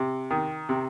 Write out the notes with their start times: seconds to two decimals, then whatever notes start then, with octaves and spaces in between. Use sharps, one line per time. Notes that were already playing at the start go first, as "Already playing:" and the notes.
Already playing: C3
0.31 D#3
0.69 C3